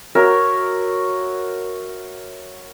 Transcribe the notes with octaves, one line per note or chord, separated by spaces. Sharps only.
F#4 A#4 C#5 E5